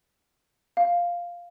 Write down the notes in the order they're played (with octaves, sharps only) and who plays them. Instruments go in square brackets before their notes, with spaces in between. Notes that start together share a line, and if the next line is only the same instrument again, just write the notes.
[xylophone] F5